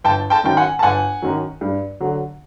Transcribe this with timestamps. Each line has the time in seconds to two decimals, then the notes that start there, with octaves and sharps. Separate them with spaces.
0.04 G1 G5 A5
0.30 G5 A5
0.44 F#2 D#3 F#3 G5
0.57 F#5 G#5
0.79 A5
0.83 G1 F#5 G#5
1.22 F#2 D#3 F#3
1.61 G2
2.00 D3 F#3